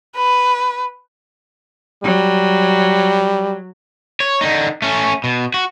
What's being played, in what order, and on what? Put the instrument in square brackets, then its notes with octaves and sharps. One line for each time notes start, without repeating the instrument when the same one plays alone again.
[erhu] B4
[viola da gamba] F#3 [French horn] G3
[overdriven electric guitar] C#5
D3 D#4
A3 C#4
B2
F#4